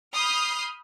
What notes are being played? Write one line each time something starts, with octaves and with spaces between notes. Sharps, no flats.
B5 D#6 F6 G6 C7